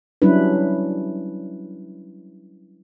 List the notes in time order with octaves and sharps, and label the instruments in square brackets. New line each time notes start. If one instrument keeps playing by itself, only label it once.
[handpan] F#3 G3 C#4 D4 E4 B4